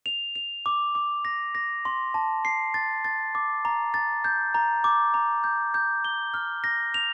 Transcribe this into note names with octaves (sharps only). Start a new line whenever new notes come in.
F7
F7
D6
D6
A#6
A#6
C6
A5
C7
A6
A6
D6
A#5
A6
G6
A#5
D6
A#5
G6
G6
G7
F6
A#6
F7